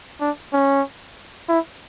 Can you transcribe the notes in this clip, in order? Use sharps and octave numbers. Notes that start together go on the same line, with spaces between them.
D4
C#4
E4